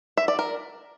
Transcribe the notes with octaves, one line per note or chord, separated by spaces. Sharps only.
E5
D5
A#4